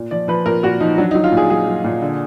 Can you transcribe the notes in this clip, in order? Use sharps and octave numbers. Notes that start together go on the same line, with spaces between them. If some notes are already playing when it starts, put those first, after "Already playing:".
Already playing: A#2
F3 D5
F3 B4
A#2 A#4
A#2 F#4
F3 D#4
F#3 D4
D#4
F#3
F4
A#2
G#4
F#3 G#4
F#3
A#2
D3